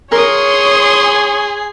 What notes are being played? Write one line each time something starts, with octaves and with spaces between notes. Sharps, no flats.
G#4 A#4 C#5 C6 D#6